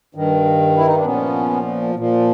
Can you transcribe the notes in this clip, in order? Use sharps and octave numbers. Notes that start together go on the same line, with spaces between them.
G2 D#3
E4
D#4
D4
A#2 F3 B3 C#4
A#2 F3